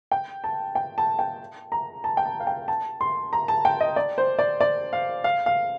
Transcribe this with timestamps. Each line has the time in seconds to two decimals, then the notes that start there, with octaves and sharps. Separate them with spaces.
0.12 G5
0.44 A5
0.75 G5
0.98 A5
1.19 G5
1.72 A#5
2.04 A5
2.17 G5
2.25 A5
2.40 F5
2.47 G5
2.68 A5
3.01 C6
3.33 A#5
3.48 A5
3.65 G5
3.81 D#5
3.96 D5
4.18 C5
4.39 D5
4.61 D5
4.93 F5
5.24 F5
5.46 F5